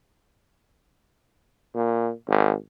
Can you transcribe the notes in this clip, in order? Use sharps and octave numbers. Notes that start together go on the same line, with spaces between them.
A#2
G#1